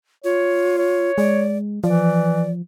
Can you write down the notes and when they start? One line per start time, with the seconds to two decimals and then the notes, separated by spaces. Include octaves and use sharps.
0.24 F4 C#5
0.78 C#5
1.18 G#3 D5
1.84 E3 F3 D5